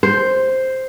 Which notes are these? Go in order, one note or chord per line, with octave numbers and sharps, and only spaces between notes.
C5